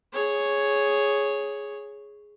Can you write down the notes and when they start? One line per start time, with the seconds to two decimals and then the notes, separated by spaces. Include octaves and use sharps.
0.13 G#4 C#5